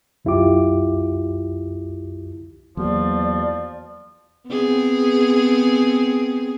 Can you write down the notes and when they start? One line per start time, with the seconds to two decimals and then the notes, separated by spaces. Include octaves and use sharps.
0.25 C2 F#2 E4 F4 G4 D6
2.77 E2 F3 F#3 A#3 F#4 D5
4.48 B3 C4 G#4